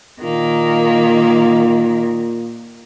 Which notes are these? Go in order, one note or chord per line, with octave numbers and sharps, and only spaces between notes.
A#2 D#3 A#3